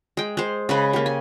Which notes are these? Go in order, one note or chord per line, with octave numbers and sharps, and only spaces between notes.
G#3 G5
G#3 C5
C#3 G#3 B4
A#3 G4
G#5